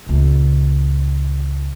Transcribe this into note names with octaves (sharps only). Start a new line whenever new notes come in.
C#2 A#2